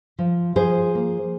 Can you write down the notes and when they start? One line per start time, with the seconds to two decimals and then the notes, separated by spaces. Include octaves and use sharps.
0.19 F3
0.56 F3 G#4 C5
0.95 A#3